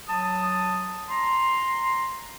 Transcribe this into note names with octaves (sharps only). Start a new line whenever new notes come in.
F#3 A5 D#6
A#5 C6